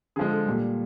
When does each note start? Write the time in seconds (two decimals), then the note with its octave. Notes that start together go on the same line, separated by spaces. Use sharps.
0.16 D3 F3 G#3 G#4
0.31 A4
0.46 A#2 G3